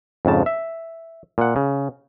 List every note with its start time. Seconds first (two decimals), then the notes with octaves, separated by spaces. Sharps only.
0.25 F2 G#2 C#3 A5
0.46 E5
1.38 A#2 F#5
1.56 C#3